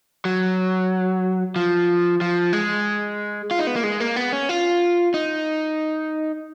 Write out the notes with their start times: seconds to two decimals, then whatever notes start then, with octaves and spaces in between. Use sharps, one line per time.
0.25 F#3
1.56 F3
2.21 F3
2.53 G#3
3.51 F4
3.59 D#4
3.67 B3
3.76 A#3
3.83 G#3
4.00 A#3
4.16 B3
4.33 C#4
4.49 F4
5.14 D#4